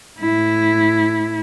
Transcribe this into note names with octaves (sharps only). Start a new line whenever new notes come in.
A2 E4